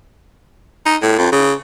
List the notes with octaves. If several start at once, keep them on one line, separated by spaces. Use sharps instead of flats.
D#4
A2
F2
C#3